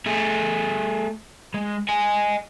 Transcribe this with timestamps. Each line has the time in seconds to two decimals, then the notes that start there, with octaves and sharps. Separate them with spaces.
0.06 A3 G#4
1.54 G#3
1.89 D#5 G#5